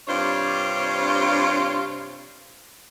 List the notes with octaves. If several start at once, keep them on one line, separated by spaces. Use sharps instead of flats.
G2 C3 D4 F4 C5 C#5